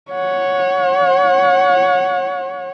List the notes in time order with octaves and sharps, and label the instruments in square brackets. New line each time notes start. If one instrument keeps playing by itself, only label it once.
[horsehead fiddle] C#5 F#5